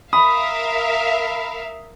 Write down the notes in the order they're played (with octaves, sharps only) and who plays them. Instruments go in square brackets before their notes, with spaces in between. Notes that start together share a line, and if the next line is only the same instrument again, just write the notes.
[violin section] A#4 E5 F5 [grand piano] B5 [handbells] D#6